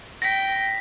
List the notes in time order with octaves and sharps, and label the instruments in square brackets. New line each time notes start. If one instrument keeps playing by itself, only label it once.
[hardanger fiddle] G5 [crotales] A#6 B6